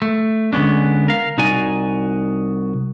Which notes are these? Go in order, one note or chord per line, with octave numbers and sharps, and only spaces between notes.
A3
D3 G#3 B3 C#4 D4
A#4 F5
C2 D#4 F#4 D5 G#5